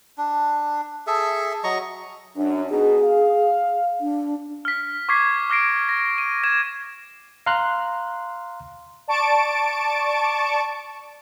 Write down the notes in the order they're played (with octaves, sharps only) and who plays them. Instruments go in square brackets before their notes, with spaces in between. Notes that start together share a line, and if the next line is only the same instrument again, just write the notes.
[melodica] D4
G#4 A4 E5
F#3 D#5 A#5 C#6
[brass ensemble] F#2 [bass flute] D4
[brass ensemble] B2 D#4 [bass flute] G#4
[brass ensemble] F5
[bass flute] D4
[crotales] F6 B6
C#6 D6 G#6 B6 C7
D6 F6 A#6 C7 D7
A#6
D#7
G#6 A#6 E7
[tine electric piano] F5 A#5 C6 F#6
[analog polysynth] D5 A5 C#6 D7